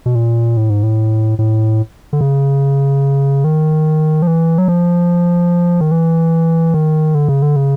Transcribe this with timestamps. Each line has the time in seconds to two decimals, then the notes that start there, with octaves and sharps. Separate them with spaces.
0.06 B2
0.15 A#2
0.57 A2
0.70 G#2
0.83 A2
1.39 A2
2.13 D3
2.21 C#3
3.44 D#3
4.22 F3
4.27 E3
4.58 F#3
4.68 F3
5.81 D#3
5.91 E3
6.74 D#3
7.15 D3
7.28 C#3
7.42 D3
7.56 C#3